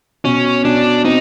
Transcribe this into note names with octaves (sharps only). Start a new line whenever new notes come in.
B2 C#4
B2 D4
C4 D#4